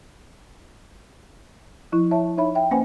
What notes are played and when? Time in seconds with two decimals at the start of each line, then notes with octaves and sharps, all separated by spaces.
1.92 F3 E4
2.11 C#5 E5 A5
2.37 D#4 C#5 E5 B5
2.55 E5 G5
2.71 A#3 C#4 B4 C5 F#5 G#5